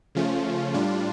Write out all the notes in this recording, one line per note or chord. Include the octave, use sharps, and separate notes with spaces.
C#3 F3 A3 C#4 F4
A2 G3 D4 F4